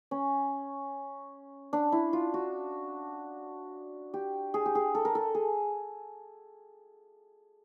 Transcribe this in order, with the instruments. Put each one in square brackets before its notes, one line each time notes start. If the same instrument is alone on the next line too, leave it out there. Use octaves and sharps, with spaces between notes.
[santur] C#4
D4
E4
F4
F#4
G4
G#4
G4
G#4
A4
A#4
A4
G#4